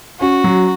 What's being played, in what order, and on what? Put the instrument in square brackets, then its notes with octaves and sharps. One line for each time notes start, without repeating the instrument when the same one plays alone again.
[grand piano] C#4 [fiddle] F#4
[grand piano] F#3